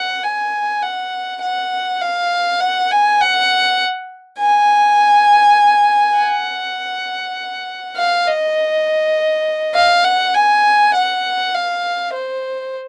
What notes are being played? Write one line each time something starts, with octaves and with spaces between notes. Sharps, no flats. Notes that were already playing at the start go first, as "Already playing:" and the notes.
Already playing: F#5
G#5
F#5
F#5
F5
F#5
G#5
F#5
G#5
F#5
F5
D#5
F5
F#5
G#5
F#5
F5
C5